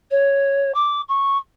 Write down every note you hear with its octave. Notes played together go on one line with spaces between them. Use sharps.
C#5
D6
C#6